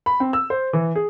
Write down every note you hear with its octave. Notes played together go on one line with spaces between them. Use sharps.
B5
C4
E6
C5
E3
G#4